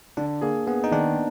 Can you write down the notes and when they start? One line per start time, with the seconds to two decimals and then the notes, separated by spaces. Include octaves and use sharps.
0.17 D3 D4
0.41 A#3 G#4
0.66 B3 G#4
0.84 D#4
0.91 D#3 D4